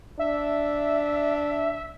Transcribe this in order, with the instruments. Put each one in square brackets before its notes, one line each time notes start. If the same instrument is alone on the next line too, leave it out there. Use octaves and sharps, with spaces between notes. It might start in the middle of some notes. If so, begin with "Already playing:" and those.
[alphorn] D4 [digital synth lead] E5